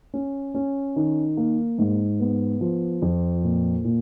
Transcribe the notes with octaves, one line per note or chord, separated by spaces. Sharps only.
C#4
C#4
D#3
A#3
G#2
B3
F3
F2
A#2
A#2